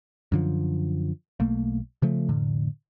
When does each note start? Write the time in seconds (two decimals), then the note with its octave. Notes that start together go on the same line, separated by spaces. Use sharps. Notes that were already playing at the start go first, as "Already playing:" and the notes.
0.32 F#2 D3 F3
1.40 B1 A3 A#3
2.02 C#3 F3 A3
2.29 F1 A2 D3